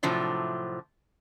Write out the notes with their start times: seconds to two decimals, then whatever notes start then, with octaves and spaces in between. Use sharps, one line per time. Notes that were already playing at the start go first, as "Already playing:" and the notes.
0.03 A2 C3 F3 F#3 D4